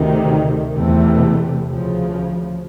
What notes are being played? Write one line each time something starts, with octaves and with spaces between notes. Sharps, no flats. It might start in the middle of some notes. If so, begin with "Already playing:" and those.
Already playing: D2 C3 D#3
E2 C3 E3 A3
D2 C#3 F3